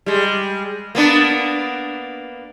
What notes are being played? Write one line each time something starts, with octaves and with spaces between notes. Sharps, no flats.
G3 G#3
A#3 B3 D4